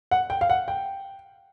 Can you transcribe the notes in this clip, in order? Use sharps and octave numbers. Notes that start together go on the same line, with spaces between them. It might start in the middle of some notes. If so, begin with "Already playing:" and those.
F#5
G5
F5
F#5
G5